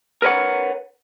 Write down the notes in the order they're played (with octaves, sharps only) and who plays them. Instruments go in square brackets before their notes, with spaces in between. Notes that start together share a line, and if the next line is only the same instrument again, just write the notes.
[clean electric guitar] A#4 B4 C#5 F#5